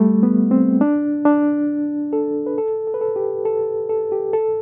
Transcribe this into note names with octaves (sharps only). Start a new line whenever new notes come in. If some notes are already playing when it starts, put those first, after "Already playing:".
Already playing: G3 A3
B3
C4
D4
D4
A4
B4
A4
A4
B4
A4
G4
A4
A4
G4
A4